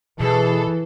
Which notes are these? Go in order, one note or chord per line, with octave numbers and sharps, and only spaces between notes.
B2 E3 G#4 A4